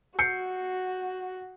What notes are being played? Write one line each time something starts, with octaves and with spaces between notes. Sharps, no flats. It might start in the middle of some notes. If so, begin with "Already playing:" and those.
F#4 G6 C7 C#7